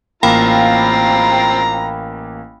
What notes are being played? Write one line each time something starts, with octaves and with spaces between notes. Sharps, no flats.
A1 A#3 C4 F4 F5 G5 A#5 B5